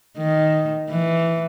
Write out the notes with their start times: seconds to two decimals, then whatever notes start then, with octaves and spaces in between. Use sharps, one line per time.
0.17 D#3
0.89 E3